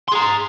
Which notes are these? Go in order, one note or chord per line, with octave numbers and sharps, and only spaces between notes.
G#4 A#5 C6